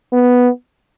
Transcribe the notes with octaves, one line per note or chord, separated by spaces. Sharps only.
B3